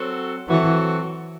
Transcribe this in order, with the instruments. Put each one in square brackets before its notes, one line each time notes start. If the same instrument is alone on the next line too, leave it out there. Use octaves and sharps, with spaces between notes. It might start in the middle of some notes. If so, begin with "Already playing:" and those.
Already playing: [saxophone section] F#3 C4 F#4 A4
[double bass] E3 [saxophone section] F#3 C4 F#4 A4